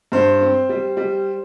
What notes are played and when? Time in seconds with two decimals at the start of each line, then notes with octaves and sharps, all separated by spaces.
0.12 G2 C5
0.41 C4
0.69 G3
0.97 G3